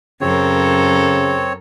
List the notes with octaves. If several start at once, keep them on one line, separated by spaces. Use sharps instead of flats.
F#2 C#3 C4 A4 A#4 C#5